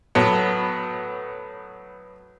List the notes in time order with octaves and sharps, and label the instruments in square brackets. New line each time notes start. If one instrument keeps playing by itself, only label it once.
[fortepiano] A2 F#3 B3